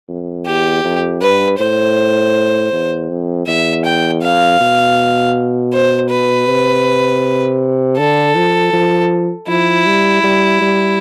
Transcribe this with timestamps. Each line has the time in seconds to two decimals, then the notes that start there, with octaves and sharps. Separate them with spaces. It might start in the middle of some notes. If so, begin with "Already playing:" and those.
0.09 F2
0.46 E2 G4
0.84 F2
1.22 G2 B4
1.59 A2 C5
2.72 E2
3.10 F2
3.47 E2 E5
3.85 G5
4.22 F2 F5
4.60 B2
5.73 C5
6.10 B4
6.48 C3
7.98 D3 A4
8.35 F3
8.73 F3
9.48 F3 E4
9.86 G3
10.23 G3
10.61 G3